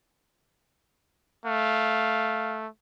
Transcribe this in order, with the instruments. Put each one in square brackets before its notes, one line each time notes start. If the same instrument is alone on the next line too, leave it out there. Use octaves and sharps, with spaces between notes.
[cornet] A3 [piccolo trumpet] F5